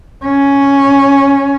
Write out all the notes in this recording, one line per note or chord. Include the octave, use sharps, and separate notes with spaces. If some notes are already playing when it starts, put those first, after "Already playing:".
C#4